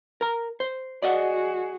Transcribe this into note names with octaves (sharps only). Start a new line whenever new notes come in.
A#4 A#5
C5
F#4 G#4 D5 D#5 F#5